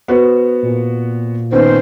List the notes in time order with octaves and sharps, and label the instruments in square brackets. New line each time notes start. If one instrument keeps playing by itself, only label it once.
[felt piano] B3 F#4 C5
[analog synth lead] A#2
[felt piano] D#3 B3 C#4 [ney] C5